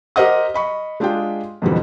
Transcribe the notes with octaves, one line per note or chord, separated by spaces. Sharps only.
G4 A#4 C5 D#5 F#5 D#6
D#5 B5 C#6
G#3 D4 F4 G4 G#4 G5
F2 G#2 B2 D3 E3 G3